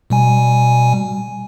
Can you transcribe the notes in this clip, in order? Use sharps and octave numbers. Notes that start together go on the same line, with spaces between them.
B2 G3 G#5